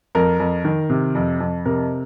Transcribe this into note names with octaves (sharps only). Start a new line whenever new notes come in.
F2 A#4
F2
D#3
C3
F2
F2
C3 A#4